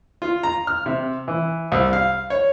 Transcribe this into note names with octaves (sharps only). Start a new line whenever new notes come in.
F4
A#5
F6
C3
E3
C2
F5
C#5